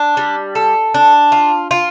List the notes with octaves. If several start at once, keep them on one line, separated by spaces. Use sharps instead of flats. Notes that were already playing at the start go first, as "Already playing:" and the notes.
Already playing: D4
G3
A4
D4
F4
F4